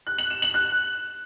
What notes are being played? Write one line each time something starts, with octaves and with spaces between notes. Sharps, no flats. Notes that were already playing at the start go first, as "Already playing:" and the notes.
F#6
F#7
E7
F#7
F#6